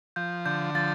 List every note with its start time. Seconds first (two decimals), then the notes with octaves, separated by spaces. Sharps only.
0.16 F3 G6
0.46 D3 G6
0.74 F3 A6